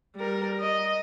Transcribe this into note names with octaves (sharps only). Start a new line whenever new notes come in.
G3 A#4
D#5